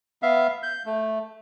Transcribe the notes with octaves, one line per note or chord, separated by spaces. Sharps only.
B3 E5 F5
G6
A3